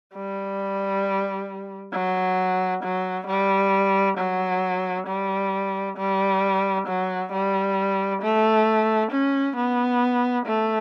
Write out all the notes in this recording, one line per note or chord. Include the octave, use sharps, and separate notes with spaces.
G3
F#3
F#3
G3
F#3
G3
G3
F#3
G3
A3
C#4
B3
A3